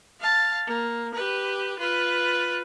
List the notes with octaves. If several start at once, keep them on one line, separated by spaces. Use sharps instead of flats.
F5 A5
A#3
G4 B4
F4 B4